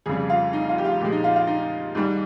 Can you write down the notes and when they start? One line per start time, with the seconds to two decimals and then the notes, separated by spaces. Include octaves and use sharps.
0.06 F2 C#3 G3 G#4
0.29 F4
0.53 D#4
0.69 F4
0.78 G4
0.85 F4
1.00 A#2 F3 G#3 G4
1.12 D#4
1.24 F4
1.36 F4
1.47 D#4
1.95 G#2 D#3 G3